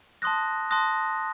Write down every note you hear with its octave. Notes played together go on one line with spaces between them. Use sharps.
A5 C6 D#6 F#6 A#6
A5 C6 D#6 F#6 A#6